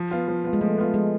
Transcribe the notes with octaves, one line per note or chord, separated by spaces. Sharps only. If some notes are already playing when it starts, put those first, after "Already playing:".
Already playing: F3
B3 F4
F3
B3 F4
G#3
F3 A3
B3 F4
F3 G#3